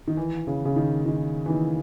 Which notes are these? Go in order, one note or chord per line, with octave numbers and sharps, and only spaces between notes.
D#3
E3
C#3
C#3
D#3
D#3
E3
D#3